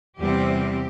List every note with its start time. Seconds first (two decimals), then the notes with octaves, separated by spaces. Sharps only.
0.18 E2 C3 G3 C4 G4
0.58 G4